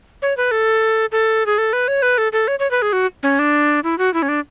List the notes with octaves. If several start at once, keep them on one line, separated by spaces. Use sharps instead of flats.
C#5
B4
A4
A4
G#4
A4
B4
C#5
B4
A4
A4
C#5
C#5
B4
G#4
F#4
C#4
D4
E4
F#4
E4
C#4
D4